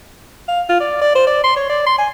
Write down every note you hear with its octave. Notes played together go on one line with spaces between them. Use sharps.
F5
F4
D5
D5
C5
D5
C6
C#5
D5
C6
G#5